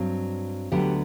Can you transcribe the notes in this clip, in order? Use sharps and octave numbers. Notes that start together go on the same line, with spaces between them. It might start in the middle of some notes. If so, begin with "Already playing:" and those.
Already playing: G2 F#3 C4
D2 D3 F#3 B3 G4